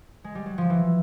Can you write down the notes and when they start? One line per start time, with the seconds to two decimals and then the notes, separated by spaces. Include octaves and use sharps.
0.24 G#3
0.35 G3
0.46 F#3
0.58 F3
0.70 E3